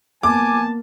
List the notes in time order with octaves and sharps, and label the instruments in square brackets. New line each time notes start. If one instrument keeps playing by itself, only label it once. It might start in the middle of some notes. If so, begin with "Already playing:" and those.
[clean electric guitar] A#3 [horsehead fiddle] B3 A5 [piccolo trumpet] G#5 [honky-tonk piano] D6